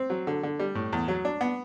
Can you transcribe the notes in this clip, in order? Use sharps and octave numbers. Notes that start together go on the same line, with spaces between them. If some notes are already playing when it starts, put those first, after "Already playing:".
Already playing: C4
F#3
D3
D3
G3
A2
E2
F#3
D4
B3